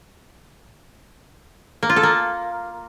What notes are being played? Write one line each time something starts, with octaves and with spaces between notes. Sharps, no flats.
A#3
F4
A4
A#3